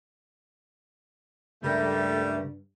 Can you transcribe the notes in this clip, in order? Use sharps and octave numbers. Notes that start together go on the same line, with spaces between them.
C#2 G2 C#3 G3 A3 A#4